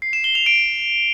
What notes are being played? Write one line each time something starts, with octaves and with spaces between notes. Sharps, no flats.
C7
E7
G7
F7
D7